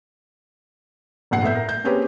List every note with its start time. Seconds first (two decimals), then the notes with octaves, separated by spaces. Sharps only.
1.31 F1 G2 A#2 F#5 C7
1.43 A2 B3 E5 G6
1.55 A#4
1.69 G6
1.84 A#3 C4 C#4 G4 G#4 B4